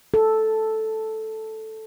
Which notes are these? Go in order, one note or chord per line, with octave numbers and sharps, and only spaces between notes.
A4